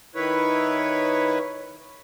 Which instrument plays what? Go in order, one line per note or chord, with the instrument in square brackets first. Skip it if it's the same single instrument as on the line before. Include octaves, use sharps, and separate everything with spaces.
[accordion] D#3 E4 B4 C#5